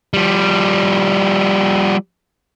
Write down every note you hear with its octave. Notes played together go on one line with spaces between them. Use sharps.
F3 G3